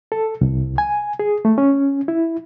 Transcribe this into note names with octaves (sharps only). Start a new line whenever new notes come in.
A4
C2
G#5
G#4
A3
C#4
E4